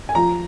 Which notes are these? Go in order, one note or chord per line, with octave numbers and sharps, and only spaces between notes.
G#5
F3 A#5